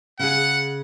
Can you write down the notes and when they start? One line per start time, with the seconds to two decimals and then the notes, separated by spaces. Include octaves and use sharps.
0.19 C#3 G#4 F#5